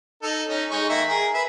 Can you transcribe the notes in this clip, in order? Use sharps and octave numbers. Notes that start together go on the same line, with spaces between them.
D#4 A4
C#4 D#4
G#3 D#4 C#6
D#3 A#3 E5
G#4 A#4
B4 E5